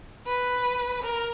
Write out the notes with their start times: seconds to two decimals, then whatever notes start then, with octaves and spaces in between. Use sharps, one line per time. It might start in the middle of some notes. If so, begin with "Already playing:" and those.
0.26 B4
1.03 A#4